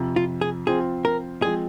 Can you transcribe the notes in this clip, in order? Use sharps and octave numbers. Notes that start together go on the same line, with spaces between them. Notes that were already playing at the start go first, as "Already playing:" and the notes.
Already playing: F2 C3 F3
F4
G#4
F3 C4 F4 G#4 C5
A#4
F3 G#3 C4 G#4